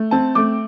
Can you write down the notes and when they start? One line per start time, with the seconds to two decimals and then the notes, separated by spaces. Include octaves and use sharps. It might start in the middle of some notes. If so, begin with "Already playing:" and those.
Already playing: A3
0.11 C4 A5
0.35 A3 D6